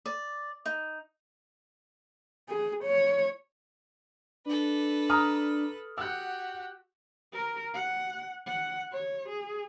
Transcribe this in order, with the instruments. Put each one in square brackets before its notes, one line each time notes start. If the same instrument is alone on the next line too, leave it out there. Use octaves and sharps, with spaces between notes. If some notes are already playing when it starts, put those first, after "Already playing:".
[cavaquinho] D5
D#4
[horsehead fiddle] G#4
C#5
[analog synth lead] D4 [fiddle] A4 B4
[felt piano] A#5 D#6 F6
[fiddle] F#4 G4 [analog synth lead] F#5 [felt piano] E6 F#6
[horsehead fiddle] A#4
F#5
F#5
C#5
G#4